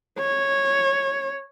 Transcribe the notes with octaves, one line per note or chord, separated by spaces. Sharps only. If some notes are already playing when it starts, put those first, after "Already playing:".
C#5